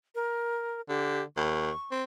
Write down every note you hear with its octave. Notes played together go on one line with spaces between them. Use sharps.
A#4
D3 G4
D#2 C#6
C4